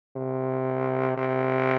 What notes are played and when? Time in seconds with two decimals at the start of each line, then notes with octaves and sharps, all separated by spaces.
0.16 C3
1.17 C3